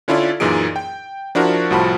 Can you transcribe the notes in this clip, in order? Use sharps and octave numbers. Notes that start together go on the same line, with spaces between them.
D3 C#4 E4 F4 A4 D5
F#2 A#2 E3 D#4 G#4 D7
G5
F3 D4 E4 F#4 A#4
C2 A2 F3 F#4 A5 B5